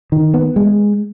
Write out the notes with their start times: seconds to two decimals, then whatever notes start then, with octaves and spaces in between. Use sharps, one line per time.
0.12 D#3
0.34 B3
0.56 G#3